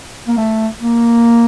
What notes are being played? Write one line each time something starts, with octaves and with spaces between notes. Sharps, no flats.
A#3
A3
A#3